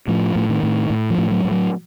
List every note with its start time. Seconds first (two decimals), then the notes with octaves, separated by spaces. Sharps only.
0.08 A2 F3
0.36 A2
0.49 D#3
0.63 A2
0.90 A2
1.10 F3
1.18 A2
1.31 F#3
1.44 A2
1.51 F#3